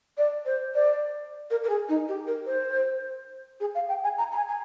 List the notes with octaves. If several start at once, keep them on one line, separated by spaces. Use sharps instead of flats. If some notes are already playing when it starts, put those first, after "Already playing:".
D5
C5
D5
A#4
A#4
G#4
D#4
G4
A#4
C5
G#4
F5
G5
G#5
A#5
A#5
G#5
G#5